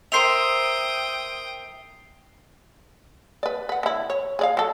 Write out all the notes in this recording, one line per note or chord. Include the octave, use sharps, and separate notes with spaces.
A#4 C5 E5 G5 D#6 C7 F7
B4 D5
B4 F#5
D3 E4
C#5
G#4 D5 F5
F#3 A4